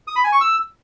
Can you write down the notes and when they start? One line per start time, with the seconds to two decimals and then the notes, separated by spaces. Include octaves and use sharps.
0.07 D#6
0.16 B5
0.24 G#5
0.32 C#6
0.41 E6